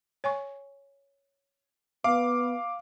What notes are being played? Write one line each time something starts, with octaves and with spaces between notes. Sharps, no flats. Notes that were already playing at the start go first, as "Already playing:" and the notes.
C#5 G#5 C#6
B3 F5 D6